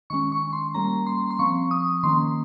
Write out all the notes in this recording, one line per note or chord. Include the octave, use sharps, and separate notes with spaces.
D#3 G#3 C#4 C#6
C#6
C6
G3 A#3 C#4 A#5
C6
C6
F3 C4 C#6
D#6
D#3 A#3 C#4 C6